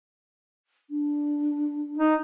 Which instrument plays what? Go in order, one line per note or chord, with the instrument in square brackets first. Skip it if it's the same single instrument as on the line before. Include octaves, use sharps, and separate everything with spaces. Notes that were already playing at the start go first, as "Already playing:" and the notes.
[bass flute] D4
[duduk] D#4